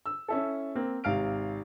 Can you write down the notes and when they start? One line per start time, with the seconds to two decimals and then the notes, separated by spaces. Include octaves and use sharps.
0.06 E6
0.28 C#4 E4 A4
0.75 A#3 C4
1.04 G#1 C3 F5 F6 D7